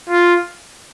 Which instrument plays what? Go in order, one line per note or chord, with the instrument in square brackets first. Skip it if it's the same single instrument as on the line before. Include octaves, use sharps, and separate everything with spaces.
[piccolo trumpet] F4